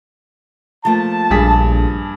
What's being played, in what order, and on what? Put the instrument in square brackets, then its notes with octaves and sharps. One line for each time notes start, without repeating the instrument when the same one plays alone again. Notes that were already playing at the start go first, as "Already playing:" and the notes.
[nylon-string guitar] F3 A3 A#3 [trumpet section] A5
[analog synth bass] A#1 [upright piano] G2 G#4 B6